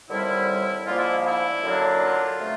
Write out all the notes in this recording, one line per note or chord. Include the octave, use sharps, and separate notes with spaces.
D#2 D3 G3 C4 E4
G#2 F3 A#3 D4 F4
E4
E4
F#2 D3 F#3 A#3 D4
F4
C3 F3 A3